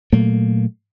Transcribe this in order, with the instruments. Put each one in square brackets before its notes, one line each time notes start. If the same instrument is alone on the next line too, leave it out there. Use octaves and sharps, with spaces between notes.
[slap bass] A#2 F#3 A3 A#3